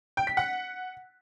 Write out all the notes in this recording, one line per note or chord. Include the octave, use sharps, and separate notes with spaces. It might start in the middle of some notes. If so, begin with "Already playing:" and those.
G5
B6
F#5